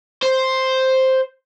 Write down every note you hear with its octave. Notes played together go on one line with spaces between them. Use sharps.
C5